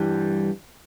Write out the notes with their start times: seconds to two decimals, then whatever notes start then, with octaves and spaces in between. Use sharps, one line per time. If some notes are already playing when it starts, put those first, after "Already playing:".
Already playing: G2 E3 G3